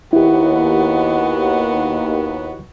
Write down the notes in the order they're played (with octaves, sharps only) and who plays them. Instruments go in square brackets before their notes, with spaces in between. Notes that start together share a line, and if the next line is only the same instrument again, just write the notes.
[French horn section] D#2 [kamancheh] B3 F#4 [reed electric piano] E4 G4